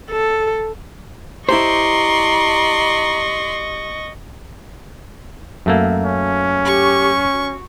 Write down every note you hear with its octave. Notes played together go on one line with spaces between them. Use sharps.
A4
E4 G4 C5 D5 D#5 A#5 C6 C#6
F#2 A3 A#3
C#4
G4 C#6
F#4